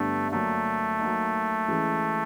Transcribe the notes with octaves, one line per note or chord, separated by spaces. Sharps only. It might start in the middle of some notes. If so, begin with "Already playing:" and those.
Already playing: G2 D3 G3 A3 B3
D3 F#3 A3 A#3 D4
F#3 A#3 D#4
C#3 E3 G#3